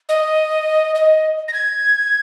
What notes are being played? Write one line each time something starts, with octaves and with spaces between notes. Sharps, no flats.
D#5
D#5
A#6
G#6